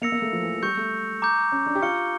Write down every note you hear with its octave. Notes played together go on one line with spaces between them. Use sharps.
A#3 E6 A#6 C#7 F7
A#3
A3
F3
E3
F3
G3 C#6 G6 C#7
A3
A#5 D6 G6
C#4
D4
G4
F4 C#6 F6 C#7 G7